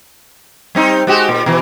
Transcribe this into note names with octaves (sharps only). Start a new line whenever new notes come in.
G3 C4 D#4
G#3 F#4 G4
A#2
B2 E3